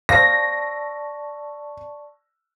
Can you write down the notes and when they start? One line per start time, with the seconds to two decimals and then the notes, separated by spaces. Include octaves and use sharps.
0.09 C5 D5 F5 A5 C#6 D#6 A#6